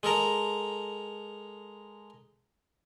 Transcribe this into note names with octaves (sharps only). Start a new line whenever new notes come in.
G#3 A4 A#4 A#5